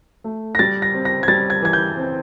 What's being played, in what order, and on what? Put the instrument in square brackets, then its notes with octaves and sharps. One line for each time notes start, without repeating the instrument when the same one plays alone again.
[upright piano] A3
[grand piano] A#6
[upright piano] G3 [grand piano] A6
[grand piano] A#6
[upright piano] C4
[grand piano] A#6
G#6
[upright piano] G3 [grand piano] A6
[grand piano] G#6
[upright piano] E3 [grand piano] G#6
[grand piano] G6
[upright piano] C4